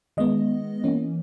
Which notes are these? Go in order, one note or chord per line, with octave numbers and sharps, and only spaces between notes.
D#3 G#3 B3 D#5
E3 A#3 C#4